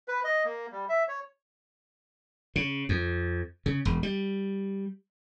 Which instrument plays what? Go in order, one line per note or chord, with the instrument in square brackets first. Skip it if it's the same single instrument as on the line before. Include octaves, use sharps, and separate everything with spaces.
[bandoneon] B4
D#5
A#3
G3
E5
C#5
[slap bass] C#3
F2
C#3
E1
G3